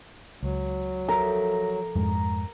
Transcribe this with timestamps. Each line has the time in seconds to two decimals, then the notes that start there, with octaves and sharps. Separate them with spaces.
0.43 C#2 F#3
1.09 F3 A4 A#4 E5
1.96 F2 G#2 G#3